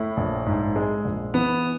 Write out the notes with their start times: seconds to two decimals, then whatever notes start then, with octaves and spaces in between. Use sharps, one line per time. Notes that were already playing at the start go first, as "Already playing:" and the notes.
Already playing: A2 E4
0.17 A#1
0.46 G#2
0.76 G#3
1.05 A#1
1.34 E3 B3